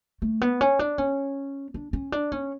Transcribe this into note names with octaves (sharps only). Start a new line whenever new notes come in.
A3
B3
C#4
D4
C#4
D4
C#4
D4
C#4